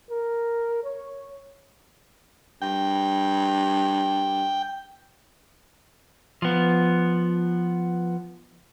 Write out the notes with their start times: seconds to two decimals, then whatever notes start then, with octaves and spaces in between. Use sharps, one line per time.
0.11 A#4
0.84 C#5
2.62 G2 G5
6.42 F3 B3